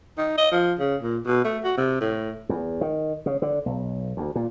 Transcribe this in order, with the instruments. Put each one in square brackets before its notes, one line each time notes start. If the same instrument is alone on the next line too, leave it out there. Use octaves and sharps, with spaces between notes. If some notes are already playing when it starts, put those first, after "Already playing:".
[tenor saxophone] D#4
D#5
F3
C#3
A#2
B2
A3
F#4
C3
A2
[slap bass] E2
D#3
C#3
D3
B1
D2
A#2